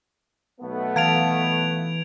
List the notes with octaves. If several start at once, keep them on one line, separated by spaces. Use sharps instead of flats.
B1 A3 B3
E3 F5 A5 G#6 D7 F7